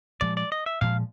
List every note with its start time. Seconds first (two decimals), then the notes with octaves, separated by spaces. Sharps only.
0.21 A#2 F3 G#3 D5
0.37 D5
0.52 D#5
0.66 E5
0.81 A#2 F3 G#3 F5